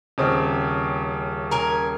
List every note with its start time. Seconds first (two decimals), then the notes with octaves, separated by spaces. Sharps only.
0.18 D#1 C#3 C4
1.51 A#4 G#5